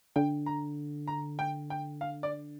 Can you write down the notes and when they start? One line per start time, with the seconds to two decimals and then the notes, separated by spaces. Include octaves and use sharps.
0.16 D3 G5
0.46 A#5
1.08 A#5
1.39 G5
1.70 G5
2.01 F5
2.23 D5